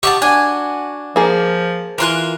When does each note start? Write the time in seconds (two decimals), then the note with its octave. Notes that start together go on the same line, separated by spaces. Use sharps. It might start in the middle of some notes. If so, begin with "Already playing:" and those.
0.03 G4 D#5 E5 F#5 A5 C#6
0.22 D4 F#4 G#5
1.16 F3 A#3 G#4
1.98 E3 F4 A#4 G#5 C6 F#6